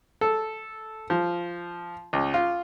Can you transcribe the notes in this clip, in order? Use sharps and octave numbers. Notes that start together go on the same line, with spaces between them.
A4
F3
C#2
F4